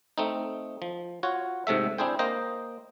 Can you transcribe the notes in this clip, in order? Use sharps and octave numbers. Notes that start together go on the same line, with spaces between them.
A3 C4 D#4
F3
F4 F#4 C#5
G#2 C3 A3 E5
C4 D4 E4 G#4 C5 G5
A#3 C5 D#5 G5 A#5